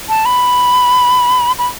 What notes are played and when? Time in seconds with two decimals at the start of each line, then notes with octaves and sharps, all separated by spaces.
0.09 A5
0.25 B5
1.59 B5